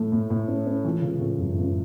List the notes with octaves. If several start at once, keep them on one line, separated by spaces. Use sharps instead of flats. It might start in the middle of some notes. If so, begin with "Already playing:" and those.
Already playing: A2 A3
A2
A2
C#4
C#4
C#2 E3
C#2 C#3
C#2 A2
C#2 F#2
C#2